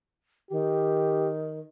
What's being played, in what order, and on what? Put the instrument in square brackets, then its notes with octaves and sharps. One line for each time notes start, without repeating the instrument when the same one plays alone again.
[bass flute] D#3 [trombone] G4